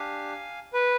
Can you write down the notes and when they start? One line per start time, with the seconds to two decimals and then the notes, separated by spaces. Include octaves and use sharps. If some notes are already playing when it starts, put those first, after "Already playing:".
Already playing: D4 G4 F5 G#5
0.73 B4